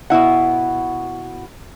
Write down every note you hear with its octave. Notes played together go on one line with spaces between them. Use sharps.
B2 B3 E4 F#5